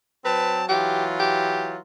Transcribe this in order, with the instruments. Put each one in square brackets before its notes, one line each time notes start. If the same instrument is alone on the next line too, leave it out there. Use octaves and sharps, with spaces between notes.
[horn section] F#3 C4 A5 [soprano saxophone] B4
[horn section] E3 F#3 F4 [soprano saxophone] G4
[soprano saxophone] G4